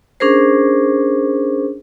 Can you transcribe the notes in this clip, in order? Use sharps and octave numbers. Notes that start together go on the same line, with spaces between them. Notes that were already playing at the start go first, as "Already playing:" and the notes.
C#4 D4 G#4 A#4 C5